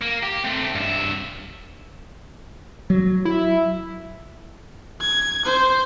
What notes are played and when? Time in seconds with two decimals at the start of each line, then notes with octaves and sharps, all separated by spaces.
0.02 A#3
0.23 G4
0.44 A3 C4
0.75 G2 E5
2.90 F#3
3.25 E4
5.01 G#6
5.45 C5